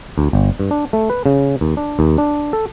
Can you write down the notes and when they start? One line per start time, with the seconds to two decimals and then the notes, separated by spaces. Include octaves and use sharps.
0.18 D2
0.33 G1
0.60 G2
0.71 D4
0.93 A3
1.10 B4
1.26 C#3
1.61 D#2
1.77 D4
1.99 D#2
2.18 D4
2.53 A4